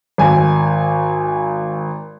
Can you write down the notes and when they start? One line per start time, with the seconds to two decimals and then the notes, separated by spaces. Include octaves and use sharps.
0.18 G#1 G#5